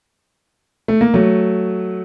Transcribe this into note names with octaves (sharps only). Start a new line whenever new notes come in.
A3
A#3
F#3 A3